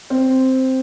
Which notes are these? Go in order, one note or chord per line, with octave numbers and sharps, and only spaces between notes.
C4